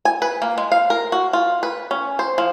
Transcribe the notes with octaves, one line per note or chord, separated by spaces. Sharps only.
G#5
B4
A#3
G#3
F5
A#4
F#4
F4
B4
C#4
C5
F3